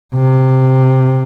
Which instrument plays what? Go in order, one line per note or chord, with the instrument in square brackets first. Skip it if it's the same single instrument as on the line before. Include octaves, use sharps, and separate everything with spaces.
[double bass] C3